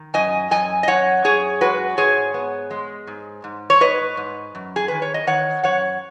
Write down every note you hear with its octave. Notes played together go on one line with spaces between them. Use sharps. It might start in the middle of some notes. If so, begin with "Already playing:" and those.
Already playing: D#3
F#2 D#5 G#5
F#2 D#5 G#5
D#5
F#2 C#5 F#5
F#2 G#4 C#5
G#3 F#4 B4
G#2 G#4 C#5
B3
G#3
G#2
G#2
C#5
G#2 B4 D#5
G#2
F#2
G#4
D#3 B4
C#5
D#5
D#3 C#5 F#5
F#2 C#5 F#5